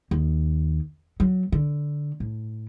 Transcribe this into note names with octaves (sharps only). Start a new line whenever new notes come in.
D#2
F#3
D3
A2